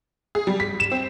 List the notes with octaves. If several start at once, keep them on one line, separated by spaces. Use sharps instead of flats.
G#4
G3
B6
E7
C4